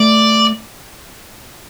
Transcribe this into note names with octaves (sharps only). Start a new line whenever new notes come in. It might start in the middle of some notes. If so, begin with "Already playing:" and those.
Already playing: A3 D5